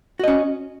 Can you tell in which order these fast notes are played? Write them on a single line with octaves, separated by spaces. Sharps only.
F#4 D#5 C#4